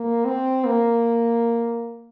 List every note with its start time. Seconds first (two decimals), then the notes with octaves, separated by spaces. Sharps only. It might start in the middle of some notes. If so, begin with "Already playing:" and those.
Already playing: A#3
0.25 C4
0.66 A#3